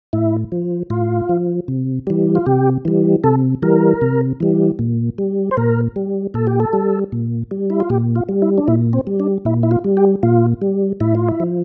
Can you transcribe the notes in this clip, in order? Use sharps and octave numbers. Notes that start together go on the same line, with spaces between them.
A2 E4
F3
A2 F4
F3
C3
E3 G3
F4
C3 G4
E3 G3
C3 A4
E3 G3 A#4
C3
E3 G3
A#2
G3
C5
A#2 A#4
G3
A#2 A4
G4
A4
G3
A#2
G3
E4
F4
A#2 G4
F4
G3
E4
D4
A#2 E4
C4
G3
D4
A#2 E4
E4
F4
G3
G4
A#2 F4
G3
A2 E4
F4
E4
F3